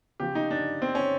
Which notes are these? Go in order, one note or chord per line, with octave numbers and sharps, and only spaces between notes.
C#3 F3 G4
D#4
D4
C4
C#4